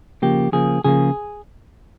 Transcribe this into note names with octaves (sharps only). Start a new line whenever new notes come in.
C#3 F3 A#3 G4
C#3 F3 A#3 G#4
C#3 F3 A#3 G#4